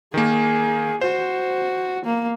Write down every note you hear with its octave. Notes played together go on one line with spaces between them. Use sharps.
D#3 A#3 G#4
F#4 C5
A#3